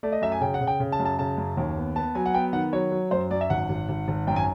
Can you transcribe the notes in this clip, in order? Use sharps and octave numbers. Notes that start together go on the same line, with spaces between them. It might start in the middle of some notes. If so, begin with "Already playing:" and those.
A3 D5
D#5
F#2 E5
G#5
C#3 G5
F#5
C#3
G5
C#3
A5
F#2
A5
C#3 A5
F#2
D#2
B3
B3 A5
F#3 G#5
F#5
B3 G5
D#3 F#5
F#3 C#5
F#3
F#2 C5
F#2 D5
E5
G#1 F#5
G#1
G#1
G#1
F#2 G5
G#5